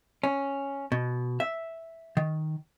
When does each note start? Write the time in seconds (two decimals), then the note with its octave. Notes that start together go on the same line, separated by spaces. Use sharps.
0.23 C#4
0.92 B2
1.40 E5
2.17 D#3